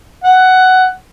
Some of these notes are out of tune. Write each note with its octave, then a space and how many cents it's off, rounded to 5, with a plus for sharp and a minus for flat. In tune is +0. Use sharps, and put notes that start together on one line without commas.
F#5 +10